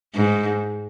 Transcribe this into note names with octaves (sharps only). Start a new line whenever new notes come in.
G#2